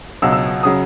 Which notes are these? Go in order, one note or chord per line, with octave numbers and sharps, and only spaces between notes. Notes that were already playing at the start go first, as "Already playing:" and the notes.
C#2 B2 F#3 E6
E6
C#3 F#3 D#6